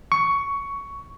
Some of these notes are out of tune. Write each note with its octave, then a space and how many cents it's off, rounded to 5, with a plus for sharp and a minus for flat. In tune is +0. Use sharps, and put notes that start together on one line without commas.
C#6 +10